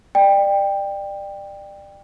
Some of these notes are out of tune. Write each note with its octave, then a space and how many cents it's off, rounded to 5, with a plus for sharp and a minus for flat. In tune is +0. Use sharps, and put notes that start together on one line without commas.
D5 +25 G5 +15